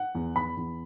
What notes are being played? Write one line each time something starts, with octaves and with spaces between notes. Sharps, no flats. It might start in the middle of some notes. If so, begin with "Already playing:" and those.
Already playing: F#5
E2
E2 B5
E2